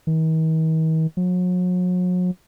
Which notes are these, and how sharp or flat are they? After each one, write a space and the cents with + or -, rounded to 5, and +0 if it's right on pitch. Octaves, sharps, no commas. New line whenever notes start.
D#3 +45
F#3 -40